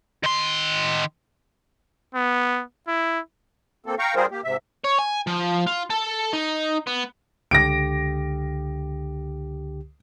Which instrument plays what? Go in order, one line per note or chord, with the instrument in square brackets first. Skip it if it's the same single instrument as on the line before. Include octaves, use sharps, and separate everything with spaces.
[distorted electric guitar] D#3 C6
[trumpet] B3
E4
[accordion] A#3 C4 A4
F5 G5 A#5 C#6
G3 C4 F4 G#4 A#4 C5
A#3 G4
G#2 C3 E5
[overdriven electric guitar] C#5
G#5
F3
F4
A4
D#4
B3
[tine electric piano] C#2 D3 G4 [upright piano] A#6 D7